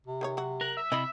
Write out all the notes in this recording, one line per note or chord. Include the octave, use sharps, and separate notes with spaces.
C3
D#3 F#4 C#5
F#3 F#4
A#4 F#6
E5
C3 E4 D#5 B5